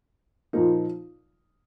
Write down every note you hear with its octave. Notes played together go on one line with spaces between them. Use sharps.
A#2 F3 A#3 D#4